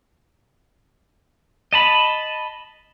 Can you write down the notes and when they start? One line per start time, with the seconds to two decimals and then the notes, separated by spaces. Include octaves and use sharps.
1.73 D#5 A5 B5